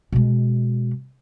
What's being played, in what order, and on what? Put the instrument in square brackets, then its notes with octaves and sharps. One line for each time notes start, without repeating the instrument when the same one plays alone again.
[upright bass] B2 G#3